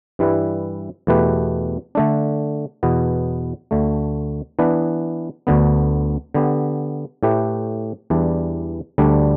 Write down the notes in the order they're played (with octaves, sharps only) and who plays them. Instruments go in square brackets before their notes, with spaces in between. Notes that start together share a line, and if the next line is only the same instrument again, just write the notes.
[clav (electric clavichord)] G2 E3 G3 E4 B4
E2 B2 A3 G4 B4
D3 A3 D4
E2 B2 B3
D2 D3 A3
E3 B3 D4 B4
D2 D3 B3
D3 B3 G4
A2 A3 G4 B4
E2 E3 G3 D4
D2 D3 G3 D4